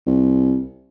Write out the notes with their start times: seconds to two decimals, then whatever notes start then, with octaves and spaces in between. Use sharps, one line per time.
0.07 C2